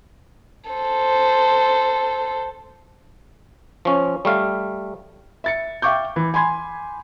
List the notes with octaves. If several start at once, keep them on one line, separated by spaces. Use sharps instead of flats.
A4 C5
F3 C#4
G3 A3 F5
E5 A6 C#7
E5 F5 G5 C#6 D6 G6
E3
G#5 B5 C6 G#6